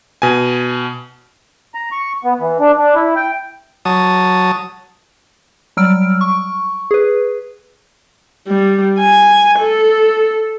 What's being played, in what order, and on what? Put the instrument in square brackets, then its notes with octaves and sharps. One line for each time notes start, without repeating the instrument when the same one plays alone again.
[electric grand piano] B2 G#5
[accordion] A#5
C#6
B3
E3
D4
D4
E4
G5
[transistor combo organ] F#3 A5 D#6
[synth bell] F#3 G3 E6 F6 D7
C#6
G#4 B4
[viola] G3
G#5
A4